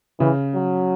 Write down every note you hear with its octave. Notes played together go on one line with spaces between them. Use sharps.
C#3 E3
F#3